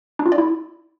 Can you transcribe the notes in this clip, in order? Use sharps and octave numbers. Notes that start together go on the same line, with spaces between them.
D4
F4
D5
E4